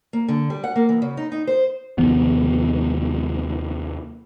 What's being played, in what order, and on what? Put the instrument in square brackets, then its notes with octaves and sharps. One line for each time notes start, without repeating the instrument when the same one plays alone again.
[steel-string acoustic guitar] A#3
D3
G3
F#5
A#3
E3
C#3
D#4
D#4
C5
[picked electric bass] D#2 C3 F3 B3